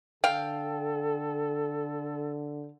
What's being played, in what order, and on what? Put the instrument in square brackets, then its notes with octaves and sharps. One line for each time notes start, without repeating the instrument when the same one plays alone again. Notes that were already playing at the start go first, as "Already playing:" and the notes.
[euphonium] D3 [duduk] A4 [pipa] F5 [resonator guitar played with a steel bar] G5